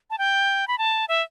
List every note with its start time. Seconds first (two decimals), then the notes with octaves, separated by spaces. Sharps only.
0.10 A5
0.18 G5
0.68 B5
0.78 A5
1.09 E5